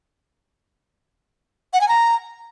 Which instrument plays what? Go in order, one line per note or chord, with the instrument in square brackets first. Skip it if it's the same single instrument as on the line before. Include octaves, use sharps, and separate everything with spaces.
[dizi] F#5
G#5
A#5